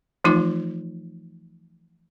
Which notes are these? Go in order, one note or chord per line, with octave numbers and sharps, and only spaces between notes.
E3 F3 A3 D#4 F4